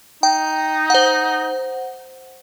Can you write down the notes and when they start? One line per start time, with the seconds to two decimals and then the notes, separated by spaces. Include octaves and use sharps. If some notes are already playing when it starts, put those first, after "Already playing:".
0.23 D#4 G5
0.90 C5 F#5